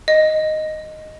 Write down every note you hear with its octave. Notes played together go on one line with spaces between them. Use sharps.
D#5